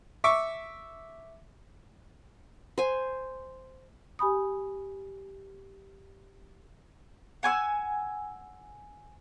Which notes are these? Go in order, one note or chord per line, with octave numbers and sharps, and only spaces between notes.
E5 C#6 D6
C5 G#5
G4 G#5 B5 D#6
F#5 G#5 C#6 E6